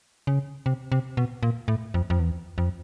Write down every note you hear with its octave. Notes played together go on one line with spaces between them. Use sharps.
C#3
C3
C3
B2
A#2
A2
F2
F2
E2
F2